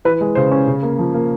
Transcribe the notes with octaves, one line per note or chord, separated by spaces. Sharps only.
E3 B4
G#3
C#3 C5
C#4
C#3
A#3
F3
A#3